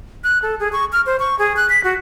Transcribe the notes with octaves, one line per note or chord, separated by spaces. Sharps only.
F#6
A4
G#4
C#6
F6
C5
C#6
G#4
F#6
B6
F#4